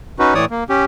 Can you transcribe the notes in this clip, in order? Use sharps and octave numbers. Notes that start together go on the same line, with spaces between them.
C#4 D#4 F#4 B4
A2 E3 C#5 D5 D#6
A#3
C#4 G4